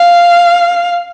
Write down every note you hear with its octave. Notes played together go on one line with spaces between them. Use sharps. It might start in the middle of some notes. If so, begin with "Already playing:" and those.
Already playing: F5